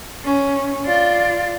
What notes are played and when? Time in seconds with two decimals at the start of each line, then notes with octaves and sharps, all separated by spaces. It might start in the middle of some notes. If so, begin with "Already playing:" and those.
0.24 C#4
0.86 F4 D5